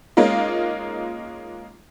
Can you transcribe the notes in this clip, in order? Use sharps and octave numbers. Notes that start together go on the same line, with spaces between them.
G#3 A#3 C#4 D#4 F4